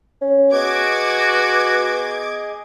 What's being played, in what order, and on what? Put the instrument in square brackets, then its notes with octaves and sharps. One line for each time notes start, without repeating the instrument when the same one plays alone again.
[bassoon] C#4
[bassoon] B3 [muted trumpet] F#4 [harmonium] G#4 D#5 [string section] D6 G#6